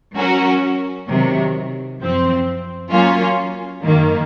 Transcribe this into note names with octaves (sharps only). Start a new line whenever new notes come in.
F#3 C#4 F#4 A#4
C3 D#3 F#3
F#2 F3 C4
F#3 A#3 C#4 F4
F#2 D#3 A#3